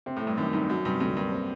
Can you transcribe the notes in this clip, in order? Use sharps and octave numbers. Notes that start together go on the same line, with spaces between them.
C3 C4
A2
A3
G2
F#2 D#3
G2 D#4
F#2 F#3
G2 C3
D2 G2
G2 A#3
C4